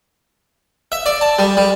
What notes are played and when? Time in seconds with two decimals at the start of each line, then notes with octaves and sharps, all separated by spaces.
0.92 E5
1.06 D5
1.21 A5
1.39 G3
1.57 G3